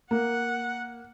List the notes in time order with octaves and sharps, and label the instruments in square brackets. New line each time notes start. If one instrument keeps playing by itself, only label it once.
[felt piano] A#3 [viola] F#5